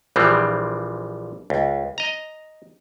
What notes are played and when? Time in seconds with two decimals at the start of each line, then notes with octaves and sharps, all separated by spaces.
0.16 A#1 E3 F3 G3 C4
1.50 C#2
1.98 D#5 A#5